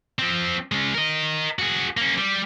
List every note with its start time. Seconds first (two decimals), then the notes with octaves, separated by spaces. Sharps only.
0.19 F3 C4
0.72 G#3 C#4
0.95 A#4 D#5
1.59 F#4 G#4
1.97 A#3 C#4
2.18 G3